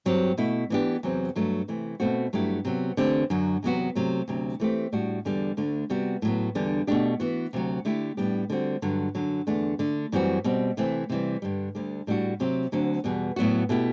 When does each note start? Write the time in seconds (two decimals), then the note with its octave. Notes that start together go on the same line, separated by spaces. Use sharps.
0.05 G2 F#3 C4 G4
0.38 B2 A3 E4
0.70 E3 B3 D4 G4
1.03 E2 C3 F#3 C4
1.36 G2 F#3 A3
1.68 C3 E3 A3
2.00 B2 A3 C4 F#4
2.33 G2 F#3 A3 E4 G4
2.65 C3 F#3 B3
2.97 E2 D3 A3 C4 G4
3.30 F#2 D3 F#3
3.63 E2 C3 F#3 B3 F#4
3.95 C3 F#3 A3
4.28 D2 C3 F#3
4.60 E3 A3 C4 G4
4.92 A2 G3 D4 F#4
5.25 E2 D3 G3
5.57 D2 D3 A3
5.90 C3 G3 B3 F#4
6.22 A2 F#3 B3
6.55 E2 D3 G3 D4
6.87 B2 A3 D4 G4
7.20 E3 B3 F#4
7.53 D2 C3 F#3
7.85 D3 A3 E4 G4
8.17 A2 G3 B3 D4 G4
8.50 D3 G3 C4 F#4
8.82 G2 D3 F#3
9.15 F#2 D3 F#3
9.47 E2 D3 A3 D4
9.79 D3 A3 D4
10.12 F#2 E3 G3 C4 F#4
10.44 B2 G3 C4
10.77 C3 E3 A3 C4
11.10 C3 E3 G3
11.42 G2 D3 G3
11.75 D2 D3 G3
12.07 A2 G3 D4 F#4
12.40 C3 F#3 C4 G4
12.72 D2 D3 F#3 C4 F#4
13.04 E2 B2 G3 B3
13.36 A2 F#3 B3 F#4
13.69 B2 A3 E4 G4